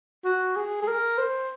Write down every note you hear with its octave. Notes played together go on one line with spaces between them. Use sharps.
F#4
G#4
G#4
A#4
C5